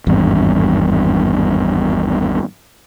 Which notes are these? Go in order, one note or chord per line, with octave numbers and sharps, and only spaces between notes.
G#1 E2 G2